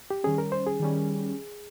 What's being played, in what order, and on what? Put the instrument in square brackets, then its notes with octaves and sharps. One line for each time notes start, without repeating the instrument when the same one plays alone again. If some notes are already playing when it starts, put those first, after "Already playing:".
[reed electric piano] G4
[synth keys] D#3 G3 C#4 [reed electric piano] G#4
[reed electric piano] A#4
C5
G#4
[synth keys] D#3 G3 C#4